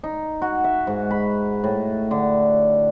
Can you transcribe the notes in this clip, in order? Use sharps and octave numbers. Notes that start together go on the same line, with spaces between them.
D#4
F#4
E5
G#2
B5
A2
D3